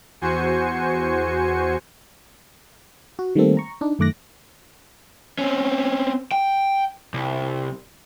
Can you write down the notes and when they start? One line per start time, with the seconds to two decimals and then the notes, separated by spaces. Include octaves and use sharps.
0.21 E2 F#4 C5 G#5 C#7
3.19 F#4
3.35 D#3 G3 A3 A#3 C4 A4
3.57 A#5 C#6
3.81 D4 D#4
3.99 F#2 D#3 A3 D6 F#6 A#6
5.39 C4 C#4
6.32 G5
7.14 C2